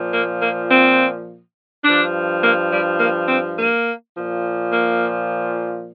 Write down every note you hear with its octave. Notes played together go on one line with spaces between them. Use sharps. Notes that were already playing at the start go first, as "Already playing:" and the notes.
Already playing: A#2 F3
A#3
A#3
C4
G2 F3 D4
A#3
G3
A#3
C4
A#3
A#2 F3
A#3